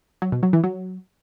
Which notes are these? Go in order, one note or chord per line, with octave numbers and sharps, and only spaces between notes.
F#3
B2
F#3
E3
F#3